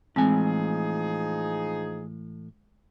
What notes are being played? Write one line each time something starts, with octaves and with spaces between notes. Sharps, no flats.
A2 E3 F3 G#3 C4 D#4 G#4 G#5